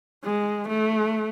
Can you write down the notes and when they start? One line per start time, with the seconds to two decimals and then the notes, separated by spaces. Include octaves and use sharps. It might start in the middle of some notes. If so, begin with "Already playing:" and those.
0.24 G#3
0.69 A3